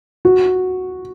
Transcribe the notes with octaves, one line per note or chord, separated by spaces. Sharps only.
F#4